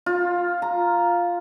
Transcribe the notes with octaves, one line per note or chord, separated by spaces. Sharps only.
F4
A#5